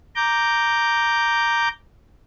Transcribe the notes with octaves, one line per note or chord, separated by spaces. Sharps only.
A#5 D6 G6